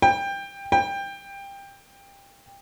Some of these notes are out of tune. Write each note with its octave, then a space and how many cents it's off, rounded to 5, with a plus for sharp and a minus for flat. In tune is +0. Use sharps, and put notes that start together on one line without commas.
G5 +20
G5 +20